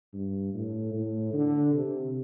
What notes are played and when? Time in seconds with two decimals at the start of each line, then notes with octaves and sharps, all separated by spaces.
0.13 G2
0.54 A2
0.93 A2
1.33 D3
1.73 C3